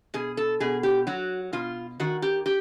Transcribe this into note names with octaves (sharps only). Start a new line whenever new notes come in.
B2 G#4
A4
B2 G#4
G4
F#3 F#4
B2 F4
D#3 F#4
G4
G4